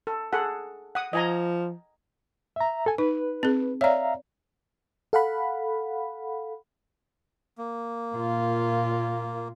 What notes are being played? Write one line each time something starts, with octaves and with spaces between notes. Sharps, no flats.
A4
G#4 A4 F#5
F#5 D#6
F3 D#5 G#5 A#5
E5 A#5
A4 G#5
D#4 B4
C4 G#4
C#5 D5 E5 F5 A#5
A4 F5 F#5 B5
A#3
A#2 F4